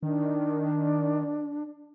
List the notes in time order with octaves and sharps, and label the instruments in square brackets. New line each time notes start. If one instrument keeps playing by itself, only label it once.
[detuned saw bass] D#3 [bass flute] D4